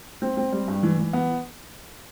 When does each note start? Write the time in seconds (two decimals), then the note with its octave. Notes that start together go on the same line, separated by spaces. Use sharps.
0.22 C4
0.37 C4
0.52 G3
0.68 G2
0.83 E3
0.98 E3
1.13 B3